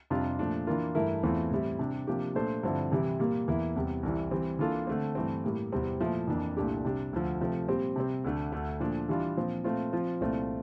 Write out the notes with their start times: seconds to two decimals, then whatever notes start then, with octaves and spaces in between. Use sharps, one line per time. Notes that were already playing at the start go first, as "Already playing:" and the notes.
0.10 F2 C3 G3 D4 F4
0.39 A#2 F3 A3 D4
0.67 E3 A#3 D4 F4 A#4
0.95 G2 E3 A3 E4 A#4
1.23 E2 E3 A3 C4 F4
1.51 A2 E3 G3 C4 E4
1.79 C3 G3 D4
2.07 C3 F3 A#3 D4 G4
2.35 A#2 A3 D4 A4 C5
2.63 G2 D3 F3 C4 E4
2.91 C3 E3 G3 C4 E4
3.20 A#2 G3 A#3
3.48 E2 E3 A#3 E4
3.76 E2 C3 G3
4.03 C2 C3 E3
4.31 E3 G3 C4
4.59 E3 A#3 D4 F4 A4
4.87 D3 A3 C4
5.15 G2 E3 A3 C4
5.44 A2 G3 A#3
5.72 E2 C3 G3 C4
6.00 A#2 F3 A3 E4
6.27 F2 E3 A#3 D4
6.57 C2 A#2 A3 D4 G4
6.84 C3 G3 D4
7.13 D2 D3 F3
7.40 C3 F3 A3 C4
7.68 A#2 G3 C4 G4
7.96 C3 G3 C4
8.24 D2 D3 A3 D4
8.52 D2 D3 A3
8.80 A#2 F3 A3 D4
9.09 E3 G3 D4 F4
9.37 A#2 F3 C4
9.64 A#2 A3 C4 F4
9.93 F3 C4 F4
10.20 C2 A#2 A3 C4 F4